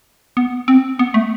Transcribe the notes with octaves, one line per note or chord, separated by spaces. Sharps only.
B3
C4
B3
A3